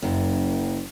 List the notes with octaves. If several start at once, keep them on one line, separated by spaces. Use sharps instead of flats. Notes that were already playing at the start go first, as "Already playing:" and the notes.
F#1 F#2